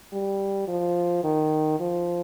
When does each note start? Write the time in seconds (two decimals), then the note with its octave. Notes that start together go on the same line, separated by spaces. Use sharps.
0.13 G3
0.68 F3
1.24 D#3
1.80 F3